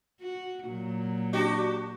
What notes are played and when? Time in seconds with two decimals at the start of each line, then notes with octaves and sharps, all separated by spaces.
0.21 F#4
0.67 A#2 F#3
1.33 D4 F#4 G4